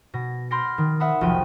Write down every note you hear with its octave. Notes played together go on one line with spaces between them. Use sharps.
B2 A#6
B5 C6 F6 G6 A#6 D7
D#3
E5 F#5 B5 D#6
F1 B1 F3 G5 D#7